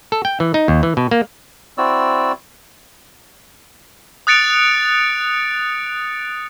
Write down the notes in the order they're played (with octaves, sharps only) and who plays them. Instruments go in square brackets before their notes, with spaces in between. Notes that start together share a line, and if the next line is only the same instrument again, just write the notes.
[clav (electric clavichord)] A4
G5
E3
D#4
D#2
E3
B2
A#3
[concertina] C4 E4 F#4 D5 E6
[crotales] D#6 F#6 A6 C#7 D7 F7